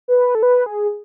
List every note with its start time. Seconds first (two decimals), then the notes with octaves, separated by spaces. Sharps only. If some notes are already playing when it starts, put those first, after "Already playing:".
0.08 B4
0.35 A4
0.43 B4
0.66 G#4